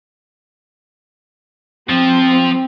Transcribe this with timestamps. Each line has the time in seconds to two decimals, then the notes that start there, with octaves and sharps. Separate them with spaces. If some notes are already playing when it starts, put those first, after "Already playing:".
1.90 F3 C4